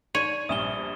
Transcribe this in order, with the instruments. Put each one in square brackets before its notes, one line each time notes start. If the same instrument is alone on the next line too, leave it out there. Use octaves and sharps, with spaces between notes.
[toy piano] D#4 D5 [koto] C#5 [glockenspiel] D#7
[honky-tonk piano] A#1 G2 [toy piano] E5 G#5 [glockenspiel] D#6 E7 G7